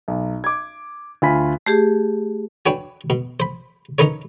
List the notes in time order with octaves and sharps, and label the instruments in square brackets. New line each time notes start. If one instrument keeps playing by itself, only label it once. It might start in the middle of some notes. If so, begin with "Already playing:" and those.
[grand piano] B1
D6 G#6
D2 F4 G#5 B5 B6
[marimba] A3 G4 G#4
[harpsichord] D4 F#4 B4 C#5 G5 G#5
B2
C5 B5
C#4 D#4 A#4 B4 C#5